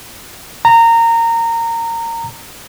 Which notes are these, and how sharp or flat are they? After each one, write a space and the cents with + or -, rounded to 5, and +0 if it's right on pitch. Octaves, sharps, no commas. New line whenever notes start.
A#5 -20